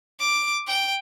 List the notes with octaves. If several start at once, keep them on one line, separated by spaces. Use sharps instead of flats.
D6
G5